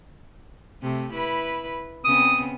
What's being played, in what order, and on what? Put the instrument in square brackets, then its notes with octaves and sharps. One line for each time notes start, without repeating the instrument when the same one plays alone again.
[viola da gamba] C3 A3
E4 B4
[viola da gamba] C#3 B3 C4 [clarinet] D#6